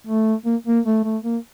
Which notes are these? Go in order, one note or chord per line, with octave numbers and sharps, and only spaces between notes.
A3
A#3
A#3
A3
A3
A#3